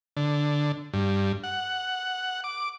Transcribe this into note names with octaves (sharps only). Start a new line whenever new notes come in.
D3
G2
F#5
D6